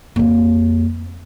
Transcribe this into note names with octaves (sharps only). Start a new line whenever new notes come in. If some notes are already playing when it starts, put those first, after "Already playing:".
F2 A#3